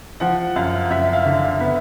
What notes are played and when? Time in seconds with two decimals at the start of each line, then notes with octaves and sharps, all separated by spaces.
0.20 F3 F#5
0.56 F#2 F5
0.91 F#2 E5
1.13 F5
1.26 D3
1.60 B3 E5